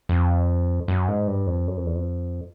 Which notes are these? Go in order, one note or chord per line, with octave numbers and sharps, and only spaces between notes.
F2
F#2
G#2
G2
F2
F#2
F2
E2
F2